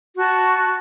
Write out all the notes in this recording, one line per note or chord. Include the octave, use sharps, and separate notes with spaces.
F#4 A5 C#6